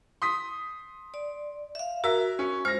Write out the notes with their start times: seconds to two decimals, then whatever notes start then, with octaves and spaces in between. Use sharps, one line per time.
0.22 C6 D#6 B6
1.14 D5
1.75 E5 F5
2.04 F#4 A#4 E5
2.39 C#4
2.65 G#3 F4 C5 F6 A#6